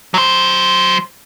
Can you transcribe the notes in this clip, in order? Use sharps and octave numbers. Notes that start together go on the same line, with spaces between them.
F#3 C5